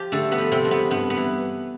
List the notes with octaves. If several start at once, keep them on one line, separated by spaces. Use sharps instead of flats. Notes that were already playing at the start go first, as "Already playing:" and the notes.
Already playing: F3 G4
D3 A3 A4
B3 B4
F3
C3 C4
F2
B3
G2 B3
B3
E3